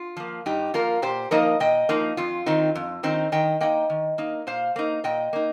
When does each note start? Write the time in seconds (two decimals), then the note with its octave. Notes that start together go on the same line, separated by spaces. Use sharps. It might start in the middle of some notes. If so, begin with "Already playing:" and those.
Already playing: F4
0.17 F3 A#3
0.46 G2 D#4 G4
0.74 F3 A#3 F4 A#4
1.02 A#2 G4 C5
1.31 F3 A#3 D#4 A#4 D#5
1.60 A#2 D#5 G5
1.89 F3 A#3 D#4
2.17 F2 F4
2.46 D#3 C4 D#4
2.75 F2
3.03 D#3 C4 D#4
3.32 D#3 D#5 G5
3.61 A#3 D#4 D#5 G5
3.90 D#3
4.18 A#3 D#4
4.47 A#2 C5 F5
4.76 A#3 D#4
5.04 A#2 D#5 G5
5.33 A#3 D#4